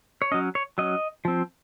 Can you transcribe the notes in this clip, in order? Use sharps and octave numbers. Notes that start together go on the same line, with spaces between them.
C#5
F#3 C#4 D#5
C#5
F#3 C#4 D#5
F3 C4